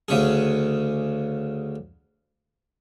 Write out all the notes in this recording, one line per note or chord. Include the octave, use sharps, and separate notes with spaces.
D2 C#3 G#4